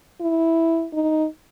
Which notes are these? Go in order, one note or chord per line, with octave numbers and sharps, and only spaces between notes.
E4
D#4